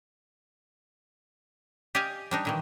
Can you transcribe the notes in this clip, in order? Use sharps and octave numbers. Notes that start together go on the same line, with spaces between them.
G4 D5 D#5 F5 G#5
G3 D4 D#4
A#2 D#3 E3